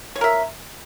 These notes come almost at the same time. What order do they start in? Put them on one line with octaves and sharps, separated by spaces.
C#5 F4 A#4 E5